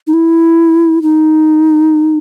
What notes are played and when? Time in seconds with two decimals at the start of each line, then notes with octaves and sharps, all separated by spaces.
0.07 D#4
0.13 E4
1.02 D#4